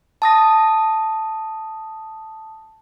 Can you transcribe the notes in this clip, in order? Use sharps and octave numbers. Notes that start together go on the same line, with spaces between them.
A5 D#6 A#6